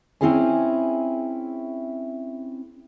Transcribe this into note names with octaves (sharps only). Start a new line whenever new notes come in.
C4 C#4 E4 G#4 G#5